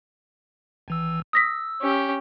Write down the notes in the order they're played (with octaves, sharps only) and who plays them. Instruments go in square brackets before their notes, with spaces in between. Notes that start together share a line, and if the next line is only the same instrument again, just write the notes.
[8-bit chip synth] G#1 E3 E6
[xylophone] D#6 A#6 B6 [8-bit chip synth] E6
[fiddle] C#4 G4